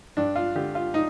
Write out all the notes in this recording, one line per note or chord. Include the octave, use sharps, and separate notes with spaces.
G2 D4
F4
D3 G4
F4
D#4